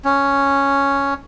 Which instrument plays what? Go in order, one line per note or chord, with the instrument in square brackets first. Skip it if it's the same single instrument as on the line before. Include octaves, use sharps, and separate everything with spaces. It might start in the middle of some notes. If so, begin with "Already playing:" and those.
[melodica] C#4